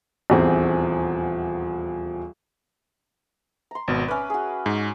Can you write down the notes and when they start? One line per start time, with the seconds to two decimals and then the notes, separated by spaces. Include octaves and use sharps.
0.30 D#1 E2 C4
3.71 A#5 C6
3.88 G#1 B2
4.08 C#4 B4 E5 D6
4.30 F#4 G#4
4.66 G#2